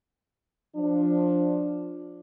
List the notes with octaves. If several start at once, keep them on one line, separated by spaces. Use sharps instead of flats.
F3 D4